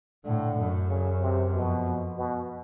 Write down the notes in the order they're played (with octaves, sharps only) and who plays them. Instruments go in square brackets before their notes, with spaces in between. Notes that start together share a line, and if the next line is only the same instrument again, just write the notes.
[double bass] A2 [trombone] D3
[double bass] F#2
[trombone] C#3
C3
[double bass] F2 [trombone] B2
[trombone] B2